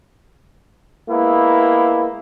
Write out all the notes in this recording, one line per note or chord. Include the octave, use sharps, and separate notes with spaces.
G#3 A#3 B3 E4